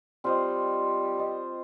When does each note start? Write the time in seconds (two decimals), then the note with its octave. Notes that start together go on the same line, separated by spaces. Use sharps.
0.24 G3 C4 F4 C5 D#5
1.18 C4 F4 C5 D#5